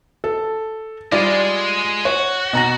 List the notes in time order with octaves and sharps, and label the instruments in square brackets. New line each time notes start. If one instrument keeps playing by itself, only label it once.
[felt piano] A4
[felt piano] G3 F4 D5 [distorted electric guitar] G#3 G#4
[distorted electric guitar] F#4 [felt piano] C#5
[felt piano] B2 A#5 A#6